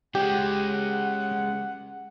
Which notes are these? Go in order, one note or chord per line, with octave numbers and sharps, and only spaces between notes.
G#3 C#4 G4 F#5